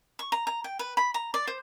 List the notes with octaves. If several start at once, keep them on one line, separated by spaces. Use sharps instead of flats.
C#6
A#5
A#5
G5
B4
B5
A#5
D5
C5